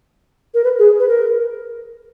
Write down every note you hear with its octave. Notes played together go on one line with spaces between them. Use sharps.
A#4
B4
G#4
B4
A#4